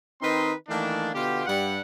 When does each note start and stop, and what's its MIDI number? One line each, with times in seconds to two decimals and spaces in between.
0.21 0.52 51
0.21 0.52 60
0.21 0.52 63
0.21 0.52 71
0.21 0.52 75
0.21 0.52 84
0.69 1.09 51
0.69 1.09 52
0.69 1.09 57
0.69 1.09 58
0.69 1.09 62
1.14 1.44 47
1.14 1.44 50
1.14 1.44 59
1.14 1.44 65
1.14 1.44 67
1.46 1.80 43
1.46 1.80 55
1.46 1.80 78